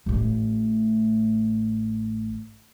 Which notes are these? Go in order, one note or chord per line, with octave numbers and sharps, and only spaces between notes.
A1 A2